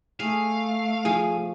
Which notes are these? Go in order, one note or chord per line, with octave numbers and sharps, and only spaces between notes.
A3 G#4 F5
F3 G#4 G#5